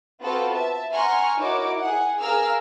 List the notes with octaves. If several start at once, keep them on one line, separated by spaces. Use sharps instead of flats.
B3 C4 F4 F#4 A4 C5
E5 A5
F#5 G#5 A#5 C6 C#6 F6
D#4 E4 F#4 A#4 C#5 D6
G#4 F#5
G#4 A#4 F5 A#5 E6 F6